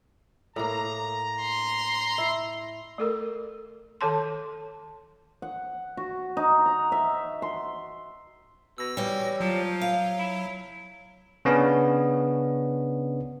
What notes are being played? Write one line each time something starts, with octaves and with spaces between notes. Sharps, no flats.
A2 A#3 A#5
C6
E4
A3 A4 A#4
D#3 A4 C#5 A5 C6
F#5
F#4
D#4
A#5
E5
C6
B2 E6 A#6
E3 G3 C#5
F3 F#3
F5
E4
C#3 B3 C#4 D4